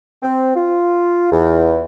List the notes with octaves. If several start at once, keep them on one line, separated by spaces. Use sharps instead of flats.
C4
F4
E2